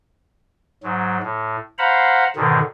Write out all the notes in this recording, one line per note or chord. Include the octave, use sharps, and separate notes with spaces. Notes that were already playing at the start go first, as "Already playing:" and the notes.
G#2 F#3
A2
C5 F5 F#5 A#5 B5
G#2 B2 D3 D#3